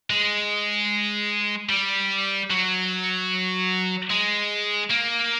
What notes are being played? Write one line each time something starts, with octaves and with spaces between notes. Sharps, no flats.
G#3
G3
F#3
G#3
A#3